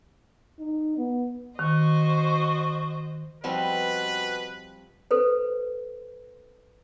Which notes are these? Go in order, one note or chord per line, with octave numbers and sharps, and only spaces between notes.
D#4
B3
D#3 F#4 C5 D#5 C#6
B2 F3 G3 C4 B4
A4 B4 C5